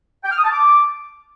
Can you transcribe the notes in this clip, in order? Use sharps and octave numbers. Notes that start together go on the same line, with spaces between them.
G5
F6
D#6
A5
D6